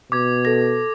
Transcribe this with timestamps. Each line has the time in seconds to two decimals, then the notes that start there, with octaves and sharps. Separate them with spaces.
0.12 B2 D6 G#6
0.45 A4 A#6